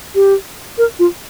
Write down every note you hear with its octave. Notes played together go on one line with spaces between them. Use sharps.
G4
A#4
F4